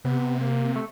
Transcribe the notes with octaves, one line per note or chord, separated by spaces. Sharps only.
C3 B3
A#3
A3